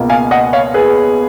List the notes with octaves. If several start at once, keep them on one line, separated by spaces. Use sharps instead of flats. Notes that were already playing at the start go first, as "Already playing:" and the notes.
Already playing: C#2 B2 A#3 F4
F5 G#5
D#5 F#5
C#5 F5
G#4 B4